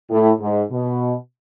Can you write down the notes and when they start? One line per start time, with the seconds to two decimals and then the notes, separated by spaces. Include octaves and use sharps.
0.10 A2
0.40 G#2
0.71 B2